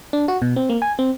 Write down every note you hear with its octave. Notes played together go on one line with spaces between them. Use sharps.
D4
F#4
B2
C4
A#3
G#5
C4